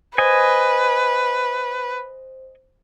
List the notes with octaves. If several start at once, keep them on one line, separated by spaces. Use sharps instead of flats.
B4 C5 D#5 G#5